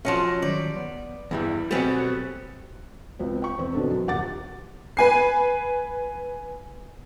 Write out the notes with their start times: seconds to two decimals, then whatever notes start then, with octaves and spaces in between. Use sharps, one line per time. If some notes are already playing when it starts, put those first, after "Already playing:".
0.05 F3 F#3 C#4 D#5 F#5 A5
0.42 D#3 F#3 G3 D5
0.76 B3
1.31 E2 G2 E3 G3 E4 B4
1.71 B2 F#3 G3 B3 C4 A4 C5 G#5
1.96 F#4 A4
3.19 C#2 C4
3.42 G5 C#6
3.59 E2 C4
3.74 B2 D3 C4 D4 A4
3.90 F#2
4.07 D#1 G4 F#5 D6 A6
4.97 B4 G#5 C7